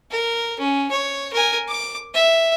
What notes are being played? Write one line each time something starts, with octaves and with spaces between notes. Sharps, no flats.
A#4
C#4
C#5
A#4 G#5
D6
E5